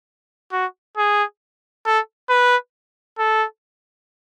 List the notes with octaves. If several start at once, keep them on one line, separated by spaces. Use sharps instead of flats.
F#4
G#4
A4
B4
A4